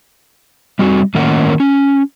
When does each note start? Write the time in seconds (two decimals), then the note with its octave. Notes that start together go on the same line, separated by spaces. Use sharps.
0.79 G3 C4 F#4
1.15 A2 D#3 A#3 C#4 A#4 F#5
1.60 C#4